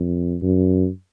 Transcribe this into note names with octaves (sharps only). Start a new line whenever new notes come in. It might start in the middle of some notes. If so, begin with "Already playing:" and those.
Already playing: F2
F#2